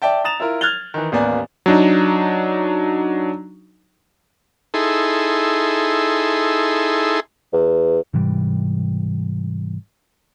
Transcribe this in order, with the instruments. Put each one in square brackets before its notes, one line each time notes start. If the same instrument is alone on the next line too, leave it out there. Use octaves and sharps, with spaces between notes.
[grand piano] D5 E5 G5 A5
A#5 D#6 A6 E7 F7
E4 F4 A#4
F6 F#6 G#6 A6 F7 G7
D#3 E3
A1 D#2 A#3 B3 D5 G#5
[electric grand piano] F#3 D4 D#4
[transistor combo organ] D#4 E4 G#4 A4 C6
[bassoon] E2
[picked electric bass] G#2 C3 E3 G3